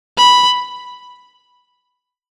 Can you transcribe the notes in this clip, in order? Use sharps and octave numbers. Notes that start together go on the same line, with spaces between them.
B5